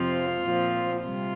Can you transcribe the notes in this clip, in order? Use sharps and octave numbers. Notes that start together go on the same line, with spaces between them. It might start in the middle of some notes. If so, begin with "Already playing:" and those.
Already playing: F2 C3 F3 C4 F4
A#2 F3 C4
C3 G3 F4